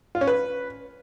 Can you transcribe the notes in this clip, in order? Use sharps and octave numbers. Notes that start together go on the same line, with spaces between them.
F4
C#4
B4